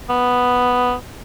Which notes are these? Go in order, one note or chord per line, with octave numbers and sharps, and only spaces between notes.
B3